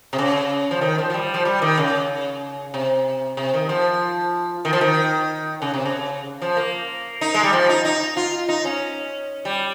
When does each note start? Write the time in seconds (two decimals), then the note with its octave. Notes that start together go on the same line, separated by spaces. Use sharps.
0.13 C3
0.18 C#3
0.71 F3
0.81 D#3
0.98 F3
1.10 F3
1.14 G3
1.34 F3
1.45 G3
1.62 D#3
1.78 C#3
2.74 C3
3.37 C3
3.54 D#3
3.69 F3
4.65 D#3
4.73 F3
4.81 D#3
5.62 C#3
5.74 C3
5.86 C#3
6.42 F3
6.57 A#3
7.21 D#4
7.34 G#3
7.43 G3
7.53 F3
7.69 D#4
7.85 D#4
8.17 F4
8.49 D#4
8.65 C#4
9.45 G3